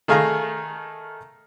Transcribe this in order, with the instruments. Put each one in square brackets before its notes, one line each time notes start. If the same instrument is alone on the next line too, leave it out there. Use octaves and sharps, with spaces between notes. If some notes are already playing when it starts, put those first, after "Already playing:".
[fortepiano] D#3 A3 G#4 F5 A#5